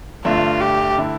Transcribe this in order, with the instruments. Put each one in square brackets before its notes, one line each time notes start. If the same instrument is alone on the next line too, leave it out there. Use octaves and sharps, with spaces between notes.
[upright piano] G1 G2 D3 A3 D4 [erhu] F4
[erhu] G4
[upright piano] D3 A3 E4